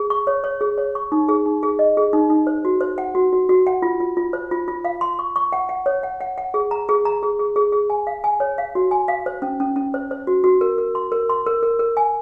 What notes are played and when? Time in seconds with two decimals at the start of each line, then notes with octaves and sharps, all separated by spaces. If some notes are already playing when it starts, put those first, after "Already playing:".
Already playing: G#4
0.10 C#6
0.27 C#5
0.44 C#5
0.61 G#4
0.78 C#5
0.95 C#6
1.12 D#4
1.29 G#4
1.46 D#4
1.63 G#4
1.79 D#5
1.97 G#4
2.13 D#4
2.30 D#4
2.47 C5
2.65 F#4
2.81 C5
2.98 F#5
3.15 F#4
3.33 F#4
3.49 F#4
3.67 F#5
3.82 F4
4.00 F4
4.17 F4
4.33 C5
4.51 F4
4.68 F4
4.85 F5
5.01 C6
5.19 C#6
5.36 C#6
5.52 F#5
5.69 F#5
5.86 C#5
6.03 F#5
6.20 F#5
6.38 F#5
6.54 G#4
6.71 A#5
6.89 G#4
7.05 A#5
7.23 G#4
7.39 G#4
7.56 G#4
7.72 G#4
7.90 G#5
8.07 F5
8.24 G#5
8.40 C#5
8.58 F5
8.75 F#4
8.91 G#5
9.08 F5
9.26 C5
9.42 C#4
9.60 C#4
9.76 C#4
9.94 C5
10.11 C5
10.27 F#4
10.44 F#4
10.61 A#4
10.78 A#4
10.95 C6
11.12 A#4
11.29 C6
11.46 A#4
11.63 A#4
11.79 A#4
11.97 G#5